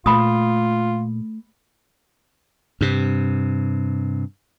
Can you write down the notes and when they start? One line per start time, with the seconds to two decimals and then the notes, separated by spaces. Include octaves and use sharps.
0.06 A#2 A3 F4 B5 D#6
2.81 G2 C3